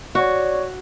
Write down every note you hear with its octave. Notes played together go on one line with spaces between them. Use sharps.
F#4 C#5 D5